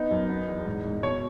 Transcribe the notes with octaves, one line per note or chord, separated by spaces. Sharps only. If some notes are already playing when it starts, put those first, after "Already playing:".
Already playing: B3 D#4
F#2
B3
E2
G#2
G#2
B2 C#5